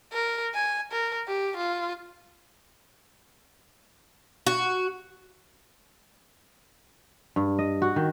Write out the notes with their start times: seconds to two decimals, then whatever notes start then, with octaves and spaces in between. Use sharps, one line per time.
0.13 A#4
0.54 G#5
0.92 A#4
1.28 G4
1.57 F4
4.47 F#4
7.36 G2
7.59 D#5
7.82 F#4
7.96 D#3